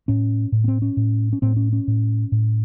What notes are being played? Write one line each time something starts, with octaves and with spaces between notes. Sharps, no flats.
A2 C#4
A2
B3
C4
C#4
A2
C#4
A2 C4
C#4
C#4
A2
A2